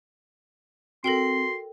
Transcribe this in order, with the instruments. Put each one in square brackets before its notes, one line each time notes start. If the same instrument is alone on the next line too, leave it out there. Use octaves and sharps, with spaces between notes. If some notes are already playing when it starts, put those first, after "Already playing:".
[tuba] C4 [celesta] F#4 A#6 [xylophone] A4 A#4 G5 [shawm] C6